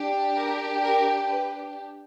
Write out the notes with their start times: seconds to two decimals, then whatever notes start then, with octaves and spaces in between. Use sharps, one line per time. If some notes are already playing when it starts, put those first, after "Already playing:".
Already playing: D4 G4
0.35 A#4
0.83 A#4
1.29 B4